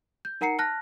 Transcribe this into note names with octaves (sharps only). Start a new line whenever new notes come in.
G6
D#4 A#4 F#5 A#5 C7 C#7
A5 F6 F#6 A#6